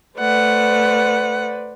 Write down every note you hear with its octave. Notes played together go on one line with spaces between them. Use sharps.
A3 B4 C5 D5 F#5